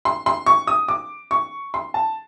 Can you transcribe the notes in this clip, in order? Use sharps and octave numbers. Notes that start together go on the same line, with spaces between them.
C6
C6
C#6
D#6
D6
C#6
C6
A5